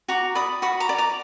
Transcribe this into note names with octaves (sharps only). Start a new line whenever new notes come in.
F#4 A#5 D6
D5 B5 D#6
F#4 B5 D#6
A#5 D6
D5
A#5 D6